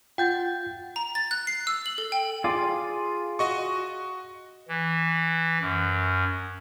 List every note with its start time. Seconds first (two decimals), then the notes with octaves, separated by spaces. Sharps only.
0.18 F4 F#5 G5 G6 A6
0.96 A#5
1.15 A6
1.31 F#6
1.47 C7
1.67 E6
1.86 F#7
1.98 A4
2.12 G5
2.44 F4 G#4 D5
3.39 F#4 D#5 C#6
4.68 E3
5.61 F#2